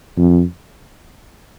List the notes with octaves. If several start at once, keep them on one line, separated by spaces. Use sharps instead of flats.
F2